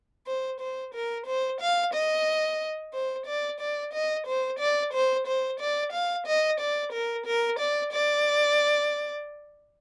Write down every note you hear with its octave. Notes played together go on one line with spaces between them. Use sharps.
C5
C5
A#4
C5
F5
D#5
C5
D5
D5
D#5
C5
D5
C5
C5
D5
F5
D#5
D5
A#4
A#4
D5
D5